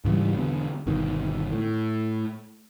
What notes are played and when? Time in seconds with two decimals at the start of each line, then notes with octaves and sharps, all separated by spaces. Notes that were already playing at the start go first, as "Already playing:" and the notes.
0.05 G#2 C#3 E3 G3
0.37 E1 D3 B3
0.87 G1 B2 D#3
1.52 A2